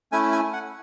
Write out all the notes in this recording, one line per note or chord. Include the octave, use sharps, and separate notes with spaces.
A3 C#4 E4 G#5
G#5
F#5